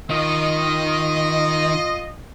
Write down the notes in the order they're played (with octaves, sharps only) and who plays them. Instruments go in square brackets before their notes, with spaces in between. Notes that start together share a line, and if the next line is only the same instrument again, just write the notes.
[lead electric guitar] D#3 [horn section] F4 D#5